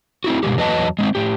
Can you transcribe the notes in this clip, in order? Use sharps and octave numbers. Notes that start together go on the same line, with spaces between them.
C4 E4 F#4
G2 B2 E3 G#3 G4
E2 F#3 B4 D#5 A5
G#3 B3 C4
A2 G4